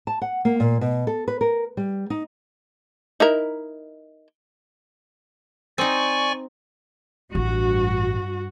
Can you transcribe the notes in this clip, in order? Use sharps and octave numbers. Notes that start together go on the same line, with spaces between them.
A5
F#5
A#3
A#2
B2
A4
B4
A#4
G3
D#4
D#4 E4 A#4
C4 D#4 D5 G#5 C#6
A1 G2 F#4